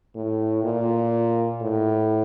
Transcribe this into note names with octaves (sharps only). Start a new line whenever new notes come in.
A2
A#2
A2